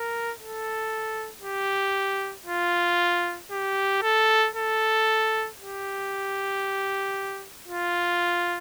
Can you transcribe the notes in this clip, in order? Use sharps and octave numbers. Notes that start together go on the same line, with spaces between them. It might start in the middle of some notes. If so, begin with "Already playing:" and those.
Already playing: A#4
A4
G4
F4
G4
A4
A4
G4
F4